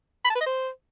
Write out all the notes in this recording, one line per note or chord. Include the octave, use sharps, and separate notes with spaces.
B5
A5
B4
D#5
C5